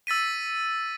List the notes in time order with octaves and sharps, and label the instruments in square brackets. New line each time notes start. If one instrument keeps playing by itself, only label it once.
[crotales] E6 A6 B6 D#7